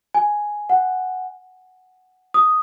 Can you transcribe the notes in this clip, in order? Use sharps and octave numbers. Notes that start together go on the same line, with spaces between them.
G#5
F#5
D#6